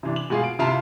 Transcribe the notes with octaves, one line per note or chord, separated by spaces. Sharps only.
C3 E3 D4
F#7
B2 G#3 F4 G#4
D7
C3 E4 F4 F5 A5 A#5